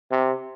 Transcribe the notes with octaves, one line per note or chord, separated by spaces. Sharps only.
C3